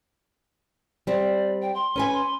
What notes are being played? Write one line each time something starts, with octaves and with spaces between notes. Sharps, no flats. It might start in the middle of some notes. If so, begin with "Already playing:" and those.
G3 C4 D5
G5
C6
C#4 B4 G#5
C6